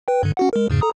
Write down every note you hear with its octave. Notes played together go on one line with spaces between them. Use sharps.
B4 G5
G2 D3
C#4 F#4 F#5
G#3 A#4
E2 G#2 C#3
A4 A#5 D#6